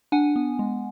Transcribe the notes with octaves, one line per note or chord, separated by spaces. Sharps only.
D4 F#5 G#5
B3
G#3